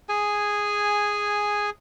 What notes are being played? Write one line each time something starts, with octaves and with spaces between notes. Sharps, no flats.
G#4 G#5